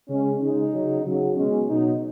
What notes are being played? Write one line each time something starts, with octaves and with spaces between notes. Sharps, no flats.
C#3 G#3 C#4
C#3 G#3 D#4
C#3 F#3
C#3 F#3
B2 G#3 C#4
B2 F#3 D#4